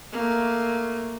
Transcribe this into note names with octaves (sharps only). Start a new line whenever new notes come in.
A3 A#3